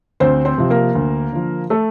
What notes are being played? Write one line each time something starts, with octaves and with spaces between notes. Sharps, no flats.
D2 C4 C5
C4 C5
C3 F3
A#3 A#4
D2
D3 F3
A3 A4